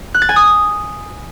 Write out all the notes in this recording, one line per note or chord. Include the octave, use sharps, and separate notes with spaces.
F#6
A6
G#5
D#6